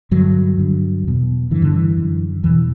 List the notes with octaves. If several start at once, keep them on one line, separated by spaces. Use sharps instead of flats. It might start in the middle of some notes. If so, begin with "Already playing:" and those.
G2 D3 F#3
G2 D3
E2 B2
G2 D3 E3
D3
E3
F#2 D3
E2 B2 E3